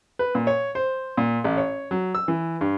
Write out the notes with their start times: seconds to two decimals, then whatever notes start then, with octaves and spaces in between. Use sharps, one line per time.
0.19 B4
0.35 A#2
0.47 C#5
0.75 C5
1.17 A#2
1.44 A1
1.57 C#5
1.91 F#3
2.15 E6
2.28 E3
2.61 G2